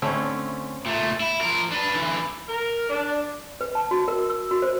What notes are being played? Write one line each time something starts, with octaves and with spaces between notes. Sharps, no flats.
D3 A3 C4 C#4 E4
A#2 A3
E4
F3 A#4
D4 B4
D3 E3
A#4
D4
B4
A5
F#4
A#4
E6
F#4
C5